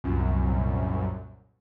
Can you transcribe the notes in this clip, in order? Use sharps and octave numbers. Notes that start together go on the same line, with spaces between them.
C2 F#2 A#2